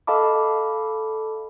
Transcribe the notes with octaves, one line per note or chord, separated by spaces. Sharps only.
A4 D#5 F5 A5 B5 D6